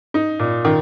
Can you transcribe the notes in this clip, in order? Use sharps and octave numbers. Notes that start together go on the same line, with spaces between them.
D#4
A#2
D#3